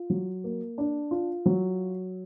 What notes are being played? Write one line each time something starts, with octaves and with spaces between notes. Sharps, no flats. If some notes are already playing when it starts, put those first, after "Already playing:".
Already playing: F4
F#3
A#3
D4
F4
F#3